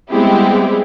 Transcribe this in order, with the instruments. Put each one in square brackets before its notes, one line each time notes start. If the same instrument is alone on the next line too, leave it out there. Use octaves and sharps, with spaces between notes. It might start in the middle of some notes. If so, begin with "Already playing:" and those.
[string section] G3 G#3 B3 C4 E4 G4